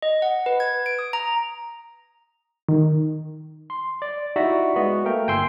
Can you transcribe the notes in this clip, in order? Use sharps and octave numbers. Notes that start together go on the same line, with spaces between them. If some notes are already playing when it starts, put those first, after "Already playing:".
D#5
F#5
B4
G#6
D7
D#6
A#5
D#3
C6
D5
D#4 E4 F#4 G4 D5 E5
G#3 B3 F#4
A3 A#3 A#4 G5
G1 G5 G#5 C6 E6